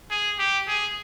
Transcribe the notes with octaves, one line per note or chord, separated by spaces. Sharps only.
G#4
G4
G#4